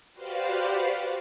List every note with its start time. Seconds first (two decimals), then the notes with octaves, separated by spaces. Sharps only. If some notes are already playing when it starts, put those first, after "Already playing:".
0.13 F#4 G4 B4 C5 D5 F5